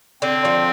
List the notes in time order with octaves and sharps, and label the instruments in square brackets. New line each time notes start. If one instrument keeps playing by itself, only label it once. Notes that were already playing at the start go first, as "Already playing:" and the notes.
[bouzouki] D3 [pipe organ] C4
[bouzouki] F3